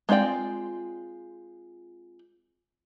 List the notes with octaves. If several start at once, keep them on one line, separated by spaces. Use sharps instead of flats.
G#3 C4 F4 D5 G5